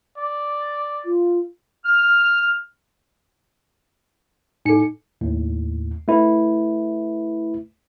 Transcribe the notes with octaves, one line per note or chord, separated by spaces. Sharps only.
D5
F4
F6
A2 D#4 A4 C#7
D#2 A2
A3 E4 B4